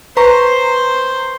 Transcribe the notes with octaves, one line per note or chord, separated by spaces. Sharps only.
B4 C5 A#5 C#6